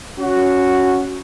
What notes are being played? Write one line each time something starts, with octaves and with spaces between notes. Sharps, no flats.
C#4 F#4